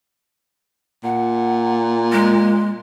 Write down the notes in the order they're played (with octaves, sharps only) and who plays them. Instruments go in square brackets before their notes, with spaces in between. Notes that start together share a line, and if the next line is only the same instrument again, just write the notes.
[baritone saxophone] A#2 [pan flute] F#5
[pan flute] G#3